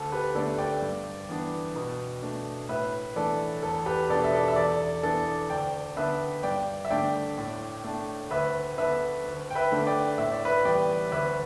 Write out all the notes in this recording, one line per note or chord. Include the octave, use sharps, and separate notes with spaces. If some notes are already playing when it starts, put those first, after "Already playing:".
Already playing: D2 A4
G4 B4
D3 A3 D4 A4 D5
D5 G5
G2
E3 B3 D4
B2
A3 D4
A2 B4 E5
E3 A3 D4 A4 D5
E2 A4
G4 B4
B2 B3 D4 A4 D5
E5
A4 D5
E5
E2 A4 D5
E3 B3 D4 A4
D2 D5 G5
D3 B3 D4 B4 E5
G2 D5 G5
E5
D3 A3 D4 D5 G5
A2
A3 D4
D2 B4 E5
D3 B3 D4 B4 E5
D2
G5
B4 E5
D3 A3 D4
D5 G5
A2 E5
D5
B4 E5
E3 G3 B3 D5 G5
D2 B4 E5